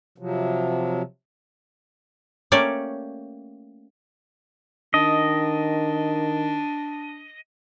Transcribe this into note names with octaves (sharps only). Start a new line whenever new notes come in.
C3 F3 F#3
A3 A#3 C#4 G4 C#5 D5
D#3 D4 D#5